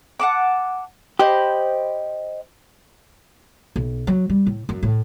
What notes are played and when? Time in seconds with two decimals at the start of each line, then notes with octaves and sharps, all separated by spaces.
0.19 F#5 A5 D6
1.19 G4 C5 D#5 B5
3.76 B1
4.07 F#3
4.30 G3
4.46 A2
4.69 F#2
4.83 A2